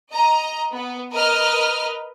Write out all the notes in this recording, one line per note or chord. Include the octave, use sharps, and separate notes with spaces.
D#5 A#5
B3
A#4 B4 D#5 F6